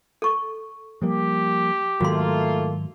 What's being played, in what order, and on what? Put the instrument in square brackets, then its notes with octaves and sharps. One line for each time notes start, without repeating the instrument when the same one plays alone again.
[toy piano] A4 C#6
[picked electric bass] F3 G3 A#3 [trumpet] G4
[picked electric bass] G#2 D#3 F#3 [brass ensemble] A3 A#3 F4 [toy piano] F#4 C6